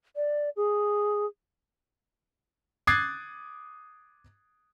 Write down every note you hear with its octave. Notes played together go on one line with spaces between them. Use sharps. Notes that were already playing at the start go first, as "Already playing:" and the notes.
D5
G#4
D6 D#6 F#6 G#6 A6 C7